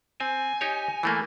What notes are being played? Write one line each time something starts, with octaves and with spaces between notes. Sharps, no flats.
C4 G#5
D#4 G4 C#5
E3 A3 A#3